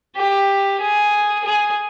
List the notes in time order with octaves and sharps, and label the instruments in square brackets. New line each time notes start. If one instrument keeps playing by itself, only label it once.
[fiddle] G4
G#4
G#4